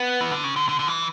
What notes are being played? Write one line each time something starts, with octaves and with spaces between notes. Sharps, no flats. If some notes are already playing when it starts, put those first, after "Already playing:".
Already playing: B3
E3
D3
C#3
D3
D3
D3
E3